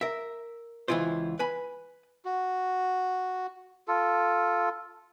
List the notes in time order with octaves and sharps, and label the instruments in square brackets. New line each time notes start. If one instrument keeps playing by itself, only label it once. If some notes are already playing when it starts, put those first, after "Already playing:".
[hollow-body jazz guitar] A#4 E5
C#2 E3 E4 F4 C5
B4 G#5 B5
[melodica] F#4
F4 A4